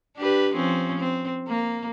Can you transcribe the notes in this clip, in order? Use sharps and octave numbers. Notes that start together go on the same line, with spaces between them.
D4 G4 B4
F3 C4 C#4
C4
A#3